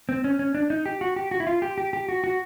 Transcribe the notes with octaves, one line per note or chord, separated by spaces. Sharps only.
C4
C#4
C#4
D4
D#4
G4
F#4
G4
F#4
E4
F4
G4
G4
G4
F#4
F#4